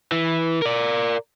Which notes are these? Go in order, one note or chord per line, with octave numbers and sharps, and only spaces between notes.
E3
A#4 D5